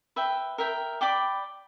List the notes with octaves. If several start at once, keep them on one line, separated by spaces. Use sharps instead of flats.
B4 E5 G5
A#4 E5 G5
D5 G5 B5 D6